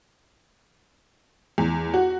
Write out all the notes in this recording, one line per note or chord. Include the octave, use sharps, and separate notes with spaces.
E2
F#4